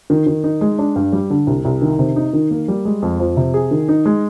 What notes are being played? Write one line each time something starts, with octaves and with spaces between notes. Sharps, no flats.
D#3
D#3
D#4
G#3
D4
G2
G3
D3
C2
C2
D#3
C3
D#4
D#3
A#3
G3
G#3
F2
F3
C3
G#4
D#3
D#4
G#3